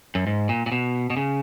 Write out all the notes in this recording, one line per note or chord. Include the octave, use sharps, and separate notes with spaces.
F#2
G#2
A#2
A#2
B2
B2
C#3